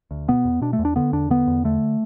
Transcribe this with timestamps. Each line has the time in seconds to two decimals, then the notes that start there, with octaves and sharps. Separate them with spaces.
0.11 D2
0.28 B2 B3
0.45 E2
0.61 B2 D4
0.73 A3
0.79 E2
0.85 D4
0.96 D3 B3
1.13 E2 D4
1.30 D3 B3
1.47 E2
1.64 D3 A3